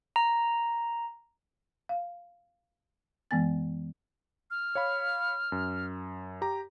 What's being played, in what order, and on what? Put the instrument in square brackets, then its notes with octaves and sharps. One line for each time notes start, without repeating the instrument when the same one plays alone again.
[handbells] A#5
[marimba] F5
F#2 E3 G#3 B3 G#5 A6
[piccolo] F6
[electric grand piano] C#5 F5 B5
F#2
G4 A#5